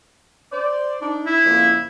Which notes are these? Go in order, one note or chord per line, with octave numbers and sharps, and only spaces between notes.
C5 D5
D4 D#4
E4
F2 C#3 A#3